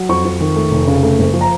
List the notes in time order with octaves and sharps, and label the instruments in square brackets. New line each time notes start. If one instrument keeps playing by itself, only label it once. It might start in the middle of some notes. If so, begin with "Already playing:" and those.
Already playing: [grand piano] F#3
F2 C#6
F2
D#3
A3
F1
C#3
A3
F#1
F3
A#5